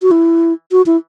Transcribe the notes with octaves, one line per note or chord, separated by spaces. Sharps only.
F#4
E4
F#4
E4